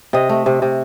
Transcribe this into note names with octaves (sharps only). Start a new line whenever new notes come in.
C3 D#5
A3
C3
C3